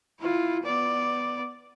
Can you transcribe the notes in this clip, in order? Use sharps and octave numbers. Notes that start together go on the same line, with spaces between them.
E4 F4
B3 D5